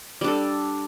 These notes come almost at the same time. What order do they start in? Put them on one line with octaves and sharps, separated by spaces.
G3 D4 A4